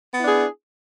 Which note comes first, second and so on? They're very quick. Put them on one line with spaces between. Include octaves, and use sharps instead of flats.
B3 E4 D4 G#4